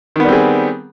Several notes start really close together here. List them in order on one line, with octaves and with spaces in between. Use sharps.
D#3 B3 G3 C4 G#4